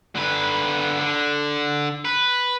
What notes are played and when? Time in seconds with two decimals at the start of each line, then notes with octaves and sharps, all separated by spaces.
0.15 D3 B4
1.00 D3
2.05 B4